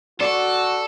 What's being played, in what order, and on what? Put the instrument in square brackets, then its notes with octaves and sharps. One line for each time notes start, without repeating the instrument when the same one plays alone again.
[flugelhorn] F#4 [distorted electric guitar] A4 [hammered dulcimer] D5